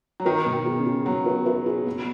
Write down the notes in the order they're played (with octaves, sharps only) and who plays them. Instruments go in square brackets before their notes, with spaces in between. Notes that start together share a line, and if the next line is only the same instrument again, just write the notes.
[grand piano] F#3
[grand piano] D#3 [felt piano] B4
[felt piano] B2
[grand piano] D#3
[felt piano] G#4
[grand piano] C#3
[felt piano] G#4
[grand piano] F#3 [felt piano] B3
[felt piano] B4
B4
G#4
B3